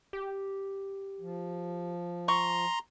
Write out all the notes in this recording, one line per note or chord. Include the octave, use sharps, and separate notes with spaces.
G4
F3
A#5 C6 C#6